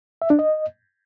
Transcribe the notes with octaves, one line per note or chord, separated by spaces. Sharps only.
E5
D4
D#5